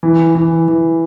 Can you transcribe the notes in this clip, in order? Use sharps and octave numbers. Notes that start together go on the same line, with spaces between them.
E3
E3
E3